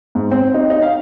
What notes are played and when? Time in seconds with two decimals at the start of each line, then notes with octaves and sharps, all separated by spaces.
0.15 G#2
0.31 C4
0.54 D#4
0.70 D#4
0.82 F5